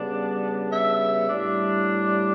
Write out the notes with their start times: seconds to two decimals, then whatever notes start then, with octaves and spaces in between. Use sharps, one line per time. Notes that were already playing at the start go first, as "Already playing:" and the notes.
Already playing: C#3 G3 B3 D4
0.73 E5
1.27 A2 G3 D4